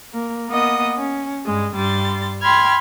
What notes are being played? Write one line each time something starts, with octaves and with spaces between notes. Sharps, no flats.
A#3
A#3 B3 D#5 F#5 D#6
C#4
G2 G#3
G2 G3 C6 A6
G5 B5 C6 F6 G#6